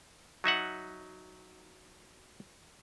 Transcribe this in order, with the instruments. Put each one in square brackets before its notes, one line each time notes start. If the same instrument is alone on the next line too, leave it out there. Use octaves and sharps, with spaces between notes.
[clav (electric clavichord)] F#3 D#4 E5 F#5